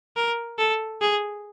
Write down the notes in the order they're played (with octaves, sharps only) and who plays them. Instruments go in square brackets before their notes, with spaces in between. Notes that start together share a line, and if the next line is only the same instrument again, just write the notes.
[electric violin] A#4
A4
G#4